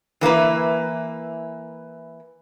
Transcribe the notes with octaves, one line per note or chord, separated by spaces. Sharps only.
E3 A#3 E4 B4